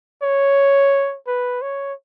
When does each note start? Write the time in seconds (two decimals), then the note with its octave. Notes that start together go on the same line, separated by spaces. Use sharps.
0.22 C#5
1.27 B4
1.62 C#5